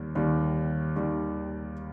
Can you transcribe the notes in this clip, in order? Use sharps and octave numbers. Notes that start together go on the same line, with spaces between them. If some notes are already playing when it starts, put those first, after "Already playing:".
Already playing: D#2 D#3 G3
D#2 D#3 G3
D#2 D#3 G3